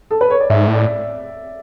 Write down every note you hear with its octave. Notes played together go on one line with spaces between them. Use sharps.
A4
B4
C#5
D5
G#2 E5
A2
D5